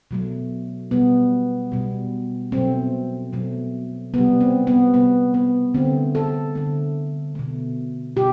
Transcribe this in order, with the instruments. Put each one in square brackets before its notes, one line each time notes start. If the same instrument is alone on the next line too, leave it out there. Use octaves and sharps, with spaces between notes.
[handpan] B2 F#3 A3
B2 G3 B3
B2 G3
B2 F#3 A3 C4
B2 F#3 A3
C3 B3
G3
C4
B3
C3 G3 B3
B3
D3 A3 C4
A4
D3 A3
B2 A3
B2 G4